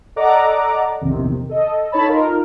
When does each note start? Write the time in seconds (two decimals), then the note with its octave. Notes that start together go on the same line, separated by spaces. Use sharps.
0.16 A4 D5 D#5 F#5 A#5 D6
1.01 A#1 E2 C3 D#3
1.49 A4 D#5
1.92 D#4 A4 C#5 A5 B5
2.05 D#4 F4 A#4